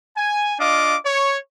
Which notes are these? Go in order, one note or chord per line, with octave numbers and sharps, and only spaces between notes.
G#5
D4 F4 D#5 F5 D6
C#5